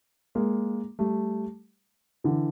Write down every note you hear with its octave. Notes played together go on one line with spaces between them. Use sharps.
G#3 A#3
G3 A3
D3 E3